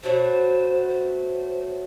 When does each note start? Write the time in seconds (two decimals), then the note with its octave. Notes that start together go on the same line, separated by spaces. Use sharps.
0.03 B2 F#3 A3 C5
0.89 C5